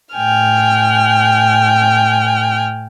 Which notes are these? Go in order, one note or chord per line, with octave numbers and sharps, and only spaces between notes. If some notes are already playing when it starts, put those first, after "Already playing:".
A2 G5 G#5 F6